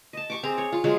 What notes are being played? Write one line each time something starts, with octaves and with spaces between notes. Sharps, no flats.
D#5 A5
G4 C#6 D6
C4 G#4 A#5
C#5
F4
F3 F#3 G#3 G#4